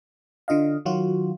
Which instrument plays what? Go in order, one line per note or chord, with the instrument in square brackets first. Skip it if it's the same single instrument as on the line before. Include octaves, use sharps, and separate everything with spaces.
[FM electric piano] D3 F4 D#5 F5
D#3 F#3 F4 F#4